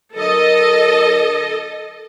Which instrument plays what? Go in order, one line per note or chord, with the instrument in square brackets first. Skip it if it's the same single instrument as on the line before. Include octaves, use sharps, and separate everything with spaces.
[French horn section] D3 F#3 A#4 [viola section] A4 D#5